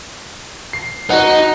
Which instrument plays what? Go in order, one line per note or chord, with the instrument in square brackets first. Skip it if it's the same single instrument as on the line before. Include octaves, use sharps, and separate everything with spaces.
[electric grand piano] C7
[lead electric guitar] D#4 [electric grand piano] F#4 F#5